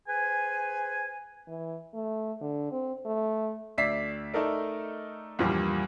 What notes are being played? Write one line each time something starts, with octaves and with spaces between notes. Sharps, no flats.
G#4 B4 C5 G#5
E3
A3
D3
C4
A3
D2 D5 E5 B6 C7
A3 D#4 A4 A#4 D5
E2 G2 A#2 F3 G3